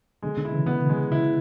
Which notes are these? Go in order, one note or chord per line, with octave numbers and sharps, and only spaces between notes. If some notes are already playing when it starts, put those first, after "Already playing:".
B2 D3 G#3
B2 D3
E4
C#3 E3
B2 D3 B3
C#3 G#3
E4